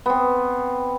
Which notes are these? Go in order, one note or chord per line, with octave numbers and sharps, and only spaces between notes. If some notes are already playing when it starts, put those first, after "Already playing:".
B3 C4